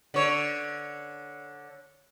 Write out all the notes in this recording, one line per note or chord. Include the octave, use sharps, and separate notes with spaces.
D3 C#5